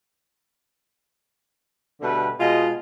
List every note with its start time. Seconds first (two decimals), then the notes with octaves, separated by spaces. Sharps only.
2.01 B2 D3 G3 A3 B4
2.39 B2 G#3 F4 D#5 G#5